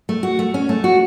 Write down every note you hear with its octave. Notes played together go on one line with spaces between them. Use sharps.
A3
F#4
A3
C#4
A3
F#4